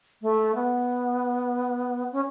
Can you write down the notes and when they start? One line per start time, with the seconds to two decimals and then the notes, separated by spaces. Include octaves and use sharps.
0.22 A3
0.55 B3
2.12 C#4